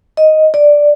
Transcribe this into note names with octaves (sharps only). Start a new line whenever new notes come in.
D#5
D5